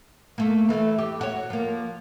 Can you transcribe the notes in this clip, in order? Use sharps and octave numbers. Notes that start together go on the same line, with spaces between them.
A3 A#3
E3 A3
G4
F#4 C#5
F3 A#3